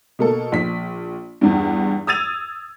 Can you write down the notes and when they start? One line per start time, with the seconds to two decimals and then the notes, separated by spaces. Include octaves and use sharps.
0.19 B2 A#3 A4
0.52 A#1 B6
1.41 E2 G2
2.07 D#6 E6 G#6 A6 D#7 F7